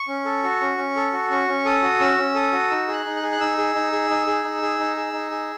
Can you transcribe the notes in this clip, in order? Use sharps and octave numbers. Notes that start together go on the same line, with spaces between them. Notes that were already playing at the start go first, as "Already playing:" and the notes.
Already playing: C#6
C#4
A4
F#4
C#4
C#4
A4
F#4
C#4 C#6
C#4
A4 D#6
F#4
C#4 E6
C#4
A4 D#6
F#4
D#4 E6
G#4 F#6
D#4
F#6
G#4
F#6
D#4 E6
G#4
D#4
G#4
D#4
G#4
D#4
G#4
D#4
G#4
D#4
G#4